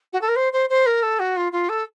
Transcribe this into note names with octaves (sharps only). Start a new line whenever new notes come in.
F#4
A4
A#4
C5
C5
C5
A#4
A4
F#4
F4
F4
A4